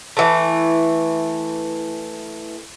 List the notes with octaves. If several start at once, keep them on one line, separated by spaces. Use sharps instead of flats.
E3 A3